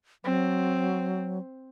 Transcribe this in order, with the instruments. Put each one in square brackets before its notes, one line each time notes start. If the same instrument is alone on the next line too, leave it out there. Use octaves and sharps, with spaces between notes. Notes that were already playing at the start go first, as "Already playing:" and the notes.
[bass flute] F#3 [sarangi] C4